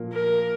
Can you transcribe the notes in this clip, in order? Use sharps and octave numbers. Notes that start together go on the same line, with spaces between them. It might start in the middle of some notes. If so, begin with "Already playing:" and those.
Already playing: A#2 F3 A#3
A#4